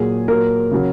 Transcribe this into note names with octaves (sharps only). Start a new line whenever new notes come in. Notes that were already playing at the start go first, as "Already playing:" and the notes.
Already playing: A#2 F#3 G#4
A#2 F#3 A#4
C#3 F#3